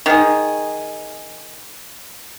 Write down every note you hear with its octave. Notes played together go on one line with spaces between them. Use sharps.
D#3 G#4